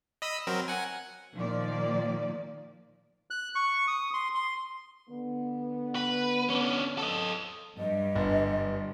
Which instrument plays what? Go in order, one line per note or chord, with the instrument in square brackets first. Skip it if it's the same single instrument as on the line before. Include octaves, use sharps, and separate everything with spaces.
[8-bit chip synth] D#5 B5 E6
F#3 C4 A#4
F#5 G#5
[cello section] A#2 D#3 F3 A#3 D5
[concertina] F#6
C#6
D#6
C6
C6
[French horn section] D3 B3
[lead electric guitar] B4
C#4 D4
A4 D#5
[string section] G2 [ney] D#5
[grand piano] G1